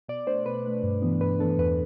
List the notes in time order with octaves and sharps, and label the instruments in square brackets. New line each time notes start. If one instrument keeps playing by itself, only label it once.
[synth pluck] B2 D5
A3 D4 C5
B2 B4
A3 D4
G2
E3 B3 D4
G2 B4
E3 B3 D4 A4
E2 B4